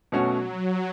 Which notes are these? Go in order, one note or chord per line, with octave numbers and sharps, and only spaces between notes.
B2 F#3 A3 C#4 F#4